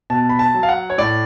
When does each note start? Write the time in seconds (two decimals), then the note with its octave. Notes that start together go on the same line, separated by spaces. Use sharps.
0.10 B2 A5
0.29 B5
0.39 A5
0.55 F#3
0.63 F5
0.69 F#5
0.90 C#5
0.98 A2 D5